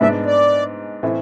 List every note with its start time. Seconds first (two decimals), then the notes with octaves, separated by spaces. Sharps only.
0.01 G#2 G#3 B3 D4 E5
0.26 D5
1.03 A2 E3 A3 C4